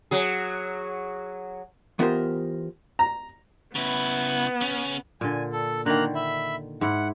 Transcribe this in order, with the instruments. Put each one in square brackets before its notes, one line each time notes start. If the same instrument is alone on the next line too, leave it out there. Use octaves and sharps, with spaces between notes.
[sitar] F#3 G#4
[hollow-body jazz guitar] E3 B3 F4 G4 A#4 C5
[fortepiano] A#5
[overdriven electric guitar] C#3 E4 [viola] B3
[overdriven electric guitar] C#3 C#4
[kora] A#2 D3 [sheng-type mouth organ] G#5
[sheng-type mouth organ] A4
[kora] D3 D#3 [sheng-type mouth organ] A#3 A#5 F#6
[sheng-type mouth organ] E5 B5
[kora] G#2 E4 [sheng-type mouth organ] F#5